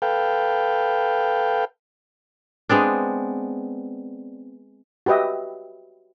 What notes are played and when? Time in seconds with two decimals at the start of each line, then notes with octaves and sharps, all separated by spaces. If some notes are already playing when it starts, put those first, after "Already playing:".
0.02 A4 B4 F5 G5
2.69 G#3 B3 C4 D4
5.06 F#4 G4 B4 D#5 E5